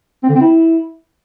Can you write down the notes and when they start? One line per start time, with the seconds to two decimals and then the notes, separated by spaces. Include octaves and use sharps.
0.23 C4
0.29 D3
0.35 C4
0.41 E4